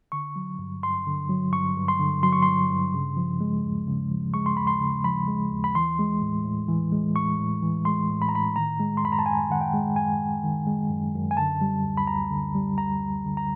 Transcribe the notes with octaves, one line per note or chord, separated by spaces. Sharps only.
D3 C#6
F#3
G2
G2 C6
D3
F#3
G2 C#6
G2
C6
D3
F#3 C6
C#6
G2 C6
G2
C#3
F3
G#3
D#2
C#3
F3
G#3 C#6
C6
D#2 B5
C6
C#3
F3 B5
G#3
D#2
B5
E3 C6
G#3
A2
A2
E3
G#3
A2 C#6
A2
E3
G#3 C6
A2
B5
A#5
A2 B5
D#3 A#5
G#3
C6
F#2 B5
A#5
A5
F#2 G#5
D#3 F#5
G5
G#3
F#2 G#5
F#2
D#3
G#3
F#2
F#2
G#5
D3 A5
G3
D2
B5
D2 A#5
D3
G3
D2 A#5
D2
D3
A#5